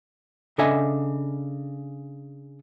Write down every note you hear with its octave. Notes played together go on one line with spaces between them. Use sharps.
C#3 D4 A4 D#5 E5 G#5